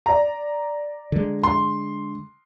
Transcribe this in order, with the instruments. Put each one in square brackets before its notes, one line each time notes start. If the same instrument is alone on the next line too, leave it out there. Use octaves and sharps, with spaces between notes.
[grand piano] D5 A#5
[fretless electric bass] D3 G#3
[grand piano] C6